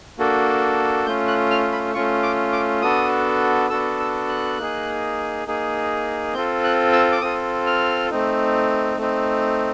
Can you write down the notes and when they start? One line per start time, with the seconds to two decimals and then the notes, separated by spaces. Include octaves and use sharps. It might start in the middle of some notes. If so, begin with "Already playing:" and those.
0.18 A#3 D4 F#4 A4
1.06 A3 C#4 F4 G6
1.28 F#6
1.51 F6
1.72 B5
1.94 A3 C#4 F4 C#6
2.23 D6
2.52 D6
2.82 B3 D4 F#4 A4 D#6
3.70 B3 D4 F#4 A4 E6
4.00 E6
4.28 F#6
4.58 A#3 D#4 G#4
5.47 A#3 D#4 G#4
6.33 C4 F4 A4 G6
6.64 F#6
6.92 E6
7.12 D6
7.21 C4 F4 A4 D#6
7.66 F6
8.10 A3 C4 D#4
8.97 A3 C4 D#4